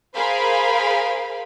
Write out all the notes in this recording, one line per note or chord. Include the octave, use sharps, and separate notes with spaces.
G#4 A#4 C5 F5 B5